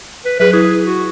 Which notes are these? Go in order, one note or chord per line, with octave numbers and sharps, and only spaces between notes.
B4
F#3 G#4 B4
E4 G#4
F#4